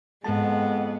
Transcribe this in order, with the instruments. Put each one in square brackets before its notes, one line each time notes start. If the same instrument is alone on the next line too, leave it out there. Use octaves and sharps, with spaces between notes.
[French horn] F2 [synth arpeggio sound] G#2 A5 [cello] G#3 [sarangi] B3